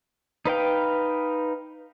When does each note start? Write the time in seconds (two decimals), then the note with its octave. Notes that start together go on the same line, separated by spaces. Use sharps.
0.45 D#4 B4 F5 G5